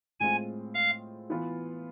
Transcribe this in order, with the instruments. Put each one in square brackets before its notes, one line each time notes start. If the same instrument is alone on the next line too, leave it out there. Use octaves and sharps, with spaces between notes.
[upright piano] A2 G#3 C4 F4 [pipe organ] G#5
[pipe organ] F5
[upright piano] E3 B3 F4